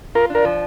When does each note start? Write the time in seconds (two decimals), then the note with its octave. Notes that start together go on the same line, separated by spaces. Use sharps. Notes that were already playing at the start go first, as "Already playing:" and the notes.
0.15 F4 A#4
0.30 D4
0.35 A#4
0.45 F3